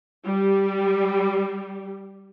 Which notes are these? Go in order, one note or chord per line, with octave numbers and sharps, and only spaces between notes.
G3 G4